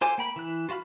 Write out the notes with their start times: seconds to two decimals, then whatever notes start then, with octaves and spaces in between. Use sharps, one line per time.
0.01 F4 A4 C5 G#5 D6
0.18 A#3 G5 B5
0.36 E3 E4 F#6
0.69 F4 F#4 F5 B5 F6